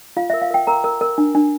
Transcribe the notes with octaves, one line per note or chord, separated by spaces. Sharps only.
F4 F5
E5
A#4
F5
A#4 G5
A#4 A#5
A#4
A#4
D4
D4